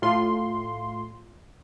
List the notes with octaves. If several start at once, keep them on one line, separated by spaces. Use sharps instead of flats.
A2 F4 C6